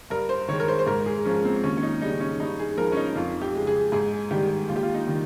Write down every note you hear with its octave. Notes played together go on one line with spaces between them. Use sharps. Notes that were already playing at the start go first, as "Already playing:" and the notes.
G2 A#4
C5
D#3 G#3 C#5
A#4
C5
C5
G#2 A#4
G#4
F3 G#3 C#4
C4
D#2 C#4
C#4
D#4
C#3 G3 D#4
C#4
G2 D#4
G#4
F3 G#3 A#4
C#4
D#4
F2 F4
G4
C#3 G#3
G#4
G#2 G#4
D#3 G3 G4
D#2 F4
G4
F4
D#4
D#3 G3